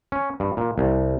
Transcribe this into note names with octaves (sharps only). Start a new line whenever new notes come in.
C#4
G2
A#2
C2